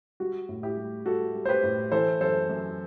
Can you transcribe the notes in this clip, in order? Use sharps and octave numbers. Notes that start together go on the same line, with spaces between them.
G3 F#4
A2
E4 G4
G3
G3 F#4 A4
G3
C5
G4 B4
A2
E3 A4 C5
F#2 A4 C5
F#2